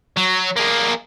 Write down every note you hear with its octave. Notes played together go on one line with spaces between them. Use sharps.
F#3
A#3 G#4